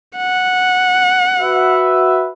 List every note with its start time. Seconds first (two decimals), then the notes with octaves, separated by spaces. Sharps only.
0.17 F#5
1.39 F#4 B4 E5